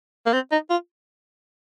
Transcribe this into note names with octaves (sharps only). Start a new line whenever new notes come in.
A#3
C4
D#4
F4